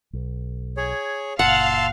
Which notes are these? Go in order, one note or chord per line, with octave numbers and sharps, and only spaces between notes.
B1
G#4 C#5
F#1 A#2 F5 F#5 A5 C6 E6